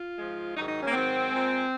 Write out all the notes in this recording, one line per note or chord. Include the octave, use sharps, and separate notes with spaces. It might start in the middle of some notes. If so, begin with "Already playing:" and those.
Already playing: F4
G#2 F3 G#3
G#2 D#3 F#3 D#4
D#4
C#4
A#3
G#2 D#3 F#3 C4
A#2 G#3